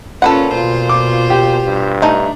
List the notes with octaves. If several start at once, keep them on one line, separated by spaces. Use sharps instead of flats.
A#2 C#4 F4 A4 B4 F#5
B2 F4 C5
D6
G4
G2
A3 D4 D#4